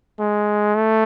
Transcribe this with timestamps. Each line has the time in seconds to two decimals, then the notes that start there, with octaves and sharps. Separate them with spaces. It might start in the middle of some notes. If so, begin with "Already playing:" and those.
0.19 G#3
0.75 A3